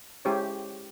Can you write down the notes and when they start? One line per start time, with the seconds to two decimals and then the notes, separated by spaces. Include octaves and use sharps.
0.25 G#3 C#4 E4 G4 C5 C#5